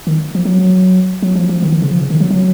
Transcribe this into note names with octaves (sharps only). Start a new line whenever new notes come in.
D#3
F3
F#3
F#3
F3
F3
D#3
D#3
C#3
F3
C#3
D#3
F#3
F#3